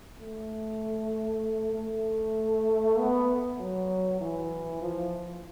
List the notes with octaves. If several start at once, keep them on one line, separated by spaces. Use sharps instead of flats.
A3
A3
B3
F#3
E3
F3